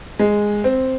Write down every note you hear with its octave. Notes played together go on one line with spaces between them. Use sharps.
G#3
C4